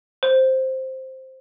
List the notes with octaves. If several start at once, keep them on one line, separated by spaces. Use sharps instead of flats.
C5